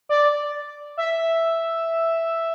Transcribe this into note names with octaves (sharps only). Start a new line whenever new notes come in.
D5
E5